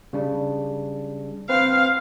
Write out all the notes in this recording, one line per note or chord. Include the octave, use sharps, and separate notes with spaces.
C#3 G3 D4
C4 B4 C5 F5